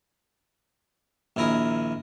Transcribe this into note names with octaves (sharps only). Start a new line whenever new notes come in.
A#1 D#2 E4 A#4 G#5 D#6